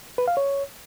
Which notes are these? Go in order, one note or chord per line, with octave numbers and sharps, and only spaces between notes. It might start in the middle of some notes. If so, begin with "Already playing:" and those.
B4
F5
C#5